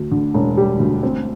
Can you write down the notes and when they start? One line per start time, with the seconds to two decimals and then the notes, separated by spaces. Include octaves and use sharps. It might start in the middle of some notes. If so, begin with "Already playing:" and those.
Already playing: D2
0.11 D3
0.34 E1
0.57 G3
0.80 D2
1.03 C4